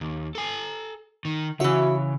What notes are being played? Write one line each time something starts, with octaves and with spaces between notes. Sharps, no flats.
D#2
A4 G#5
D#3
C#3 E3 F#4 C#5 E5